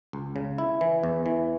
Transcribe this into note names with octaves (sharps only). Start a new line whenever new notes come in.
C#2
C#3
E4
E3
E2
E3